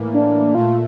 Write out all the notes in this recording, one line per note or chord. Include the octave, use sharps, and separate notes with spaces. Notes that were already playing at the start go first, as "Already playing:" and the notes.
Already playing: A2 E3 A#3
D4
A#2 A3 F4